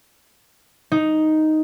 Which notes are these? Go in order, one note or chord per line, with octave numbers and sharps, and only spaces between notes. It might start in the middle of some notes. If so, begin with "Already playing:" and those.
D#4